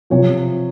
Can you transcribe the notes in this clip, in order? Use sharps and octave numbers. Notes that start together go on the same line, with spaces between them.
C3 F3 C#5